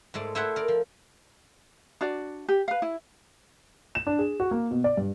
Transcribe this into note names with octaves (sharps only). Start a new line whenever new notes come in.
G#2 G#3 A3 D5
A3 E4 C5 C#5 E5 F#5
A#4 D5
F3
D4 F#4 D5
G4
B4 F5
E4
E7
D4
G#4
F#4
A#3
B2
D5
G2